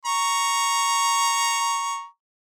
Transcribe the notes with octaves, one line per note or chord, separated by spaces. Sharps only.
A#5 C#6